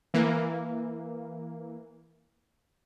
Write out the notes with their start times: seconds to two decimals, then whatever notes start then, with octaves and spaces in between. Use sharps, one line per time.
0.14 E3 A#3